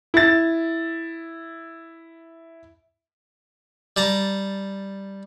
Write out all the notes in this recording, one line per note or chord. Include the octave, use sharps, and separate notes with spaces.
E4 A6
G3 A5 A#5